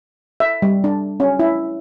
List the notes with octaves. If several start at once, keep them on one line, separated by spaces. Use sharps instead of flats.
E5
G3
D4
C#4
E4